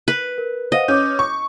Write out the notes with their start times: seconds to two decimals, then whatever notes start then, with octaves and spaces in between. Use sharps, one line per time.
0.08 B4
0.38 A#4
0.72 C5 D#5 F5 F#5
0.88 C#4 D6 G6
1.19 C#6